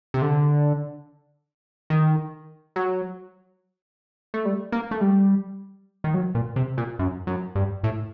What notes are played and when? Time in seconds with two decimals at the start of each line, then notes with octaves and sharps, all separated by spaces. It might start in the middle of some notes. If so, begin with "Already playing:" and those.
0.14 C3
0.22 D3
1.90 D#3
2.76 F#3
4.34 A3
4.45 G3
4.72 A#3
4.91 A3
5.01 G3
6.04 D#3
6.14 F#3
6.35 A#2
6.56 C3
6.78 A#2
6.99 F#2
7.27 F#2
7.55 G2
7.84 A2